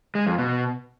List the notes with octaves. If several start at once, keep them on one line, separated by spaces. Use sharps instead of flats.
G#3
F2
B2